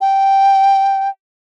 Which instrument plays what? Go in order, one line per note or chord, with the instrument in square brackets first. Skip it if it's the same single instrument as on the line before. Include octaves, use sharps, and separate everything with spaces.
[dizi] G5